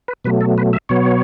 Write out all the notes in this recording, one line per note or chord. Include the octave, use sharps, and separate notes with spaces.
B4
B2 F#3 A3 B4
A4
B4
E5
B2 F#3 B3 C#5